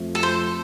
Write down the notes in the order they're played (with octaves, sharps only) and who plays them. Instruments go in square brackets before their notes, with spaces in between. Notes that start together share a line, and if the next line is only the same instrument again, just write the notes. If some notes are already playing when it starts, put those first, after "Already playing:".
Already playing: [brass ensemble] F2 F3 A3 F4
[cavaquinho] A4
C5